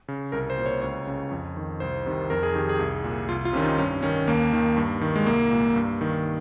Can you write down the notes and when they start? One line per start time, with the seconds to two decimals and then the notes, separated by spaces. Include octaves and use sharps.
0.08 C#3
0.32 C2 A#4
0.50 C5
0.58 A#2
0.66 C#5
0.82 C#2 C#5
1.07 C#3
1.31 F2
1.57 D#3
1.80 C2 C5
2.06 C3 D#3
2.30 F2 A#4
2.43 G#4
2.55 D#3 G4
2.69 G#4
2.79 C2
3.04 A#2
3.28 C2 F4
3.45 F4
3.53 C3 D#3 C#4
3.62 D#4
3.78 G2 C#4
4.02 D#3 C#4
4.27 D#2 A#3
4.53 D#3
4.77 G2
5.01 D#3
5.16 G#3
5.26 C2 A#3
5.51 A#2
5.76 G2
6.01 D#3